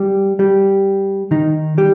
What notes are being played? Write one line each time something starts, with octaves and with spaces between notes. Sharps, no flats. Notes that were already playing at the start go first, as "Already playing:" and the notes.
Already playing: G3 G4
G3 G4
D#3 D#4
G3 G4